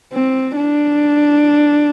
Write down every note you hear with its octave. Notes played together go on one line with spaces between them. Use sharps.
C4
D4